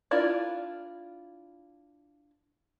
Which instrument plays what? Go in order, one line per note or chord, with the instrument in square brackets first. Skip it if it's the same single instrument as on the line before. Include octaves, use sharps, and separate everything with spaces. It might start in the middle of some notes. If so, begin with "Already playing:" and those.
[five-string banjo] D4 E4 F4 A#4 D5